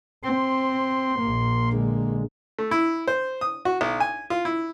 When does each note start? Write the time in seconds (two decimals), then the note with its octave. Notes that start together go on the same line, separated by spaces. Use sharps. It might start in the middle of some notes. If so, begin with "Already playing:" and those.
0.23 C4 C6
1.18 A#1 A#3
1.73 D3 G#3
2.59 A3
2.71 E4
3.08 C5
3.41 D#6
3.65 F#4
3.81 B1
4.00 G#5
4.30 F4
4.45 E4